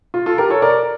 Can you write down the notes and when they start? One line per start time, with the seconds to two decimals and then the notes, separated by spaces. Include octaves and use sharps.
0.14 F4
0.26 F4 A4
0.38 G4 A#4
0.50 A4 C#5
0.62 A#4 D5